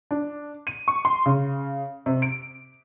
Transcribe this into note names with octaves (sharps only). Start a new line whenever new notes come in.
D4
D#7
C#6
C6
C#3
C3
D7